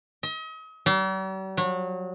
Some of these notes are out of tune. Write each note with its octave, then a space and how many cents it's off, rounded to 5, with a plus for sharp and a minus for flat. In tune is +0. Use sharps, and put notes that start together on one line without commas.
D#5 +40
G3 -45
F#3 -30